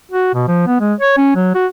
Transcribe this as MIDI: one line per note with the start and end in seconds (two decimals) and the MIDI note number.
0.12 0.29 66
0.34 0.46 47
0.48 0.67 53
0.67 0.78 59
0.80 0.94 56
1.01 1.13 73
1.17 1.33 61
1.36 1.54 54
1.55 1.67 66